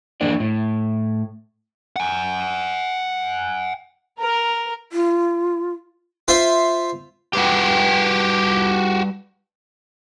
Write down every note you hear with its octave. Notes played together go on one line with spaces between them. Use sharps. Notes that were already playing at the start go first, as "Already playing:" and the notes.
F#2 E3 A#3 D4 A#4 D5
A2
F#5 G#5
A#4
F4
F4 C5 E5
G3 F#4 G4 B4 G5